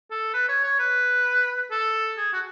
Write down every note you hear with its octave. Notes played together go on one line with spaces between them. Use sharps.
A4
B4
C#5
C#5
B4
A4
G#4
F#4